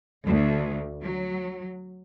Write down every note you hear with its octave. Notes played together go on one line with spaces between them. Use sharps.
D2
F#3